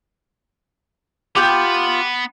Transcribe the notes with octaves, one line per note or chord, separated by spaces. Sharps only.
B3 F4 G4 B5 G6